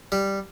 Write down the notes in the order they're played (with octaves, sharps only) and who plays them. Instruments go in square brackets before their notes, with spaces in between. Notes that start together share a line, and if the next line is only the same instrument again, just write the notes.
[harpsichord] G3